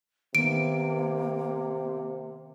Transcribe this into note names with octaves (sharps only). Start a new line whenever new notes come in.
C3 D#3 A#3 B3 D7